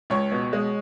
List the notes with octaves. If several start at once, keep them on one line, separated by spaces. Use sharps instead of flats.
C#2 C#5
B2
G#3